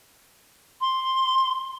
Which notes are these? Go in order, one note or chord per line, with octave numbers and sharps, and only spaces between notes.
C6